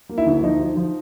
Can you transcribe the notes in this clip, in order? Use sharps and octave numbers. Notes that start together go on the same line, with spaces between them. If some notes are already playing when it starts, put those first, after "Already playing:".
A#3
E4
D2
F3 D#4
F3
F3